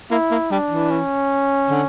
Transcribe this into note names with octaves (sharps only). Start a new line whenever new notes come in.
A#3 E4
A#3
G3 D4
E3
C#4
D3